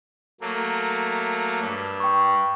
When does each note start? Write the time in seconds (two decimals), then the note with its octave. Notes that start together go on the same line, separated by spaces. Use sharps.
0.41 F#3 A3 A#3
1.60 G2
2.00 G5 C#6